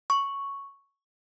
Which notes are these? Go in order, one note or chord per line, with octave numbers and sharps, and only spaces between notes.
C#6